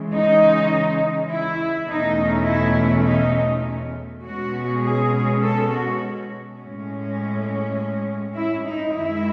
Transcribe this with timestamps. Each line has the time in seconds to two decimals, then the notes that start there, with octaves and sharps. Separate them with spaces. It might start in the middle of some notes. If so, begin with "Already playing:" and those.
Already playing: C#3 E3 G#3
0.12 D#4
1.29 E4
1.88 E2 B2 A3 C#4 D#4
2.47 E4
3.06 D#4
4.24 B2 G#3 C#4 F#4
4.82 G#4
5.41 A4
5.70 F#4
6.59 A2 G#3 C#4
8.35 E4
8.65 D#4
8.94 F#2 D#3 G#3 E4